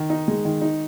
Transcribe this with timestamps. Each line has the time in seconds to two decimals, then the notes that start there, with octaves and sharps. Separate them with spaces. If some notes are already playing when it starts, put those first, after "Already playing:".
Already playing: D#3
0.10 D#4
0.28 G#3
0.45 D#3
0.62 D#4